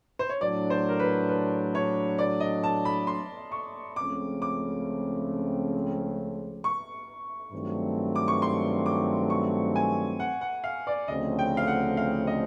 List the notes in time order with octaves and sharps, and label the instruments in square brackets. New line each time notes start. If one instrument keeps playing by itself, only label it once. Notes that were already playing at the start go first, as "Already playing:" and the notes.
[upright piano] C5
C#5
[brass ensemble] A2 F#3 A3 D4 [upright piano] D5
[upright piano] C5
A#4
B4
B4
C#5
D5
D#5
A5
B5
C6
C#6
[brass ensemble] C#2 C#3 F3 A3 C4 [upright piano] D6
[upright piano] D6
C#6
[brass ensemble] G2 D#3 F#3 A3 C4
[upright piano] D6
C#6
C6
D6
C#6
G#5
F#5
F#5
F5
D5
[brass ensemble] D2 C#3 F3 A3 C4 [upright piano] D#5
[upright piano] G5
F5
F#5
F5
D#5